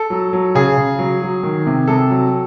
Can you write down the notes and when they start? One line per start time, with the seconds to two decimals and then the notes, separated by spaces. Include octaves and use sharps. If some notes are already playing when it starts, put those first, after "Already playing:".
Already playing: A4
0.10 F#3
0.33 F#3
0.55 C#3 G#4
0.78 C#3
0.99 F#3
1.22 F#3
1.43 D#3
1.67 C3
1.88 C3 A4
2.10 F#3